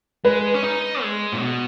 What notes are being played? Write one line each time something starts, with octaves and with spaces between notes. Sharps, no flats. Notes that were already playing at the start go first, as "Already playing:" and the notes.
G#3 B4
C#4
D#4
G#3
A#2
B2